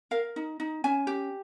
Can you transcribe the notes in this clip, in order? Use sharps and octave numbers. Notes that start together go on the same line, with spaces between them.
A#4 F5
D#4
D#4
C#4 G#5
G4